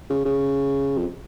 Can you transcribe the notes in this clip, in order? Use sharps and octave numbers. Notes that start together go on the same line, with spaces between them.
C#3
C#3
F2